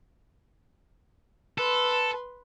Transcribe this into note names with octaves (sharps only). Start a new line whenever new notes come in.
A4 B4 C6